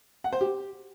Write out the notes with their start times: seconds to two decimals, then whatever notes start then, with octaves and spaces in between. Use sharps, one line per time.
0.24 F#5
0.33 C5
0.41 G4